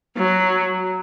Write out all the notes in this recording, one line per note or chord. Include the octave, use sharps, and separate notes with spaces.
F#3